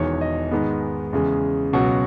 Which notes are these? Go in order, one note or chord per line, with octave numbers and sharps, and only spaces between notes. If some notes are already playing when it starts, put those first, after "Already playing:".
Already playing: E1 E2 D#3 C#5
D#5
G#2 D#3 G#3 B3
E2 C#3 G#3
C#2 B2 F#3 C#4 F#5